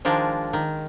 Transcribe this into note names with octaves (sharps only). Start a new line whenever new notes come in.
D#3 F3 G#3 D4
D#3